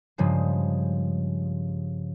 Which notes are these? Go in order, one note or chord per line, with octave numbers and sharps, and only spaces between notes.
G2 C#3 F3 G#3